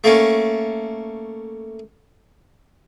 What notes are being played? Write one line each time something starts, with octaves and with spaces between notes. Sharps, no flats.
A3 A#3 C#4